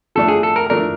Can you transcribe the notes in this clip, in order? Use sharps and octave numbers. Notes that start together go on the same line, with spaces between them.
F3 A3 D4 A4
G#4
A4
A#4
F3 A3 D4 A#4